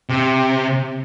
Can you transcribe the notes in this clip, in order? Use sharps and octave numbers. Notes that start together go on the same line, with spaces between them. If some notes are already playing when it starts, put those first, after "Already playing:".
C3